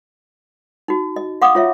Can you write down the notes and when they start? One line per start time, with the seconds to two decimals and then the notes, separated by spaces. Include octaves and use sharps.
0.88 D#4 F#4
1.16 D#5
1.42 F5 F#5 C6 D6 D#6
1.55 F4 C#5 E5